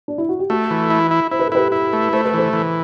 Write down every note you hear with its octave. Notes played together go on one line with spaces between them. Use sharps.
D4
E4
F#4
G4
A3 F#4 A4
E3
E4
E4
E4 C5
B4
A4
E4 G4 B4
E4
A3
A3 C5
B4
E3 A4 C5
E3